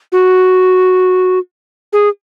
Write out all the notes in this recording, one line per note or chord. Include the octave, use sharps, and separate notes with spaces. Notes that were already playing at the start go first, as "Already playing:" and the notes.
F#4
G#4